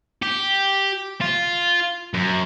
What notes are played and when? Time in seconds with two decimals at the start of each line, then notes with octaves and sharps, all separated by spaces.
0.23 G4
1.21 F4
2.14 F#2